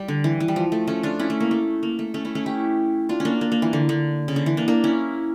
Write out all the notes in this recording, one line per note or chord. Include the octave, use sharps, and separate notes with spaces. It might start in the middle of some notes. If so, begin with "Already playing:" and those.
Already playing: G3 G4
D3
E3
E3
G3
F3
A3
A3 C#4
D4 F4
C#4 E4
A3
A#3
A3
A#3
A3
A3 C#4
C#4 E4
A3 C#4
E4 G4
D4 F4
C#4
A#3 D4
A#3
A#3
E3
D3
D3
C#3
D3
E3
A#3 D4
A#3 D4
C#4 E4